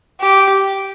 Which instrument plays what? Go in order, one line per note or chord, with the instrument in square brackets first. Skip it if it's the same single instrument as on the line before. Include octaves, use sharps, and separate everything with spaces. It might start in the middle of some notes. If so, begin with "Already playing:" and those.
[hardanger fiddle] G4